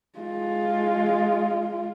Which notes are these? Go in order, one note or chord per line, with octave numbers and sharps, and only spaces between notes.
G#3 F4